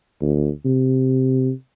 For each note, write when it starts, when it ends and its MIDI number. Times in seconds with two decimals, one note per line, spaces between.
0.21 0.50 38
0.65 1.52 48